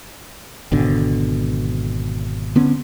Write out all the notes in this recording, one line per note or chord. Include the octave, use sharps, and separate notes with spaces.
G#1 B2 D3
D3 B3 C#4